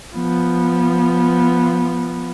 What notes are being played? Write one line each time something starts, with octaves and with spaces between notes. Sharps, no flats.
F3 B3